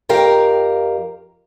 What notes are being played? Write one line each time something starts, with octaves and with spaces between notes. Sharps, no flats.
F2 G4 A#4 F5